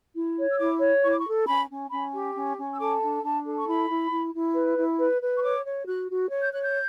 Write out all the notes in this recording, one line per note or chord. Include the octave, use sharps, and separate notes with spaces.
E4
C#5
E6
E4 D6
C#5
E4 C#6
D6
C#6
A4
C#4 B5
C#4
C#4 B5
G4
C#4
C#4
E6
A4 D6
D4
D4 A5
A4
C#6
E4 B5
E4
E4
E4
B4
E4
B4
B4
C#6
C#5 D6
C#5
F#4 F#6
F#4
C#5
G6
C#5 F#6
G6